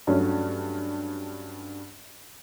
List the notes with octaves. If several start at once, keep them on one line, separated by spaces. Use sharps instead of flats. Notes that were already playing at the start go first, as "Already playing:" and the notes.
G2 F#3 A3 C#4